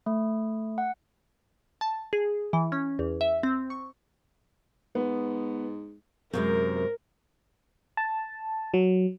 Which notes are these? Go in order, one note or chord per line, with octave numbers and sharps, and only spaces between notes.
A3
F#5
A5
G#4
E3
C#4
E2
E5
C4
C#6
G#2 B3
F#2 C3 G#3 A#4
A5
F#3